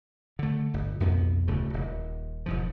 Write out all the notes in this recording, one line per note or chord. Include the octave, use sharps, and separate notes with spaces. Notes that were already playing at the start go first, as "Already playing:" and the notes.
D3 A3
G1
B1 F2 B3
D1 D2 C#3 A3
D#1
E1 G#2 F3